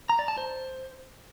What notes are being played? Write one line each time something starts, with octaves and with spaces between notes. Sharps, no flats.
A#5
D5
A5
C5